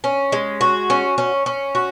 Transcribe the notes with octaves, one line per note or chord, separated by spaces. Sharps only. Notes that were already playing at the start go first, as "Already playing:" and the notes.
C#4
G#3
F#4
C#4
C#4
C#4
F#4